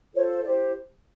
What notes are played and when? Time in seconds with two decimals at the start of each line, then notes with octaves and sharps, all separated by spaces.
0.14 F4 A4 C5 C#5
0.43 E4 G4 C5 D5